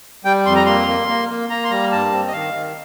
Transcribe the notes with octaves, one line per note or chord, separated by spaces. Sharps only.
G3 G5
F2 C6
A#5
A#3 C6
A#3
A#3
A#3
A#3 A#5
C6
G3 A#5
G2 A5
C4
D#5
D#3 F5
D#3